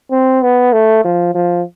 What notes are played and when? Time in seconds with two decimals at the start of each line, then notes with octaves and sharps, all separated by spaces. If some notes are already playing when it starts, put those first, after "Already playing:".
0.11 C4
0.43 B3
0.73 A3
1.04 F3
1.35 F3